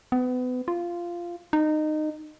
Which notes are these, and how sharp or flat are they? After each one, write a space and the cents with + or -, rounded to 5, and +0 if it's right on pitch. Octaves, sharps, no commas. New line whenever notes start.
B3 +30
F4 -10
D#4 -20